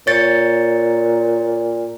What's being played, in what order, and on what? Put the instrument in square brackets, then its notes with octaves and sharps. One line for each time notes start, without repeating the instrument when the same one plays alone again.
[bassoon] A#2 [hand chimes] C#5 A6 C#7